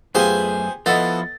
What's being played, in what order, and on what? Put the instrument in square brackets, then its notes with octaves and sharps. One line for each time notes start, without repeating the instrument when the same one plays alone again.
[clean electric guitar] F#2 A3 [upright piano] B3 F4 G4 [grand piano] G#4 [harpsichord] C5 G#5
[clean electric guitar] F3 E4 [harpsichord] B3 A4 [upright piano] D#5 F#5 [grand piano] A6